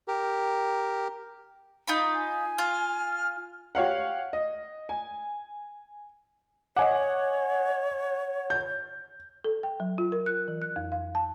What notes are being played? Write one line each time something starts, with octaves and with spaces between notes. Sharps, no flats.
G4 A#4
D#4 F4 B5
G#5
F4 F6
G4 C#5 F5 F#5
D#5
G#5
C#5 D#5 F#5 G#5 D6
G6
A4
G5
F#3
F4
A#4
F#6
E3
F#6
F2
F5
A5